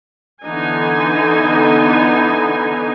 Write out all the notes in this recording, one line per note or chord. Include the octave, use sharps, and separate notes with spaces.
D3 E3 B3 D#4 G#5